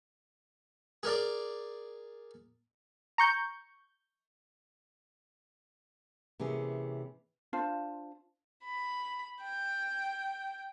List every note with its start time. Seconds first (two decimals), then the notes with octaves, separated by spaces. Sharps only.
1.03 G#4 A#4 D5
3.18 A#5 C#6 G6
6.39 C3 E3 A#3 C#4 G#4
7.53 D4 F4 C5 F5
8.65 B5
9.43 G5